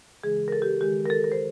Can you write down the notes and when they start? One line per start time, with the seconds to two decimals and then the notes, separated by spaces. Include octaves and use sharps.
0.23 C#3 E3 G#3 G#4
0.48 A#4
0.52 A4
0.62 G4
0.81 D#3 G#3 G4
1.06 A#4
1.10 A4
1.24 A#4
1.32 C5